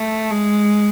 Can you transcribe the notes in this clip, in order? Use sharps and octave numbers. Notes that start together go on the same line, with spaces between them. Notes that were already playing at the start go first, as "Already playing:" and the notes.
Already playing: A3
G#3